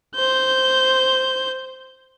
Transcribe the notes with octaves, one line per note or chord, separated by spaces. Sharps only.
C5 G6